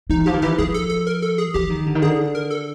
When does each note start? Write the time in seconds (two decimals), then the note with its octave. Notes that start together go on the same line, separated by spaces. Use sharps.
0.10 E3 D#4
0.26 F3 G4
0.34 D#3
0.42 E3 G4
0.58 F3 G#4
0.74 A4
0.90 A4
1.07 A#4
1.22 A4
1.38 G#4
1.54 E3 G4
1.70 D#3
1.86 D3
1.95 D#3
2.02 D3 G#4
2.35 A#4
2.50 A4